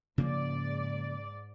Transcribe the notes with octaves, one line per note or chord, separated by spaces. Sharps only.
G#2 C#3 F3 A#3 D5